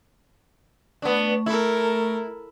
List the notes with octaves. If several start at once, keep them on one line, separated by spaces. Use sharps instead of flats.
A3 B3 D4 C#6
E4 A4 A#4